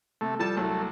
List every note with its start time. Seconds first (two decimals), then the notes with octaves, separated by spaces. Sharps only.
0.21 C3 A3
0.39 F3 G3 A4 A5
0.57 C2 F#3 A3